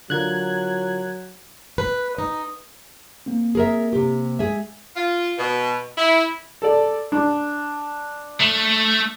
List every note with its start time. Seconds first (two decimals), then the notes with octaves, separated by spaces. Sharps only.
0.10 D3 F#3 F4 A#4 F#6 G#6
1.78 B4
2.18 D#4
3.26 A#3 C4
3.55 G#4 A#4 E5
3.93 C3 G4
4.39 G#3 G#4 E5
4.96 F4
5.38 B2
5.98 E4
6.62 A4 D5
7.12 D4
8.41 A3